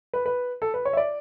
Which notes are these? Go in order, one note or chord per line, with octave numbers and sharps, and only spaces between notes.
B4
B4
A4
B4
C#5
E5
D5